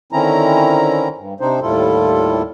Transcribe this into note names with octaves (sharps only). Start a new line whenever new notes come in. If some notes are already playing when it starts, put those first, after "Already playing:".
D3 D#3 C4 C#4 E4 A#5
G2
C3 C4 D4 D#4 C5
D#2 A2 G3 E4 F4 A4